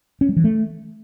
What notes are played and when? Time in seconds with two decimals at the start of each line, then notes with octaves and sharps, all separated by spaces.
0.21 C#4
0.29 G3
0.36 E3
0.44 A3